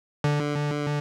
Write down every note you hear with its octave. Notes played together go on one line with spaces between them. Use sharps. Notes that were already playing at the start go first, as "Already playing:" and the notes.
D3